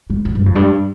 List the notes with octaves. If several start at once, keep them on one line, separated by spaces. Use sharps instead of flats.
G#2
F2
G2
F2
G2